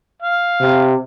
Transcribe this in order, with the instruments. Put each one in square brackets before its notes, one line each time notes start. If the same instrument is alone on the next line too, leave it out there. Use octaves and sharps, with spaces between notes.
[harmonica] F5
[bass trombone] C3